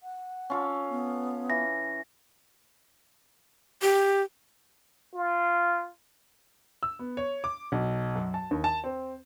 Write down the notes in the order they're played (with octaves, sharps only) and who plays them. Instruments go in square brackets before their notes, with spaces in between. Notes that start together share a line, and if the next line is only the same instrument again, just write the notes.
[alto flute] F#5
[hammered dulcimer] C#4 F4 A4
[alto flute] B3
[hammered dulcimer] E3 [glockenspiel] A#6
[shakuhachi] G4
[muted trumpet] F4
[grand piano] E6
B3
C#5
D6
B1
F#2
A5
D#2
A5
C4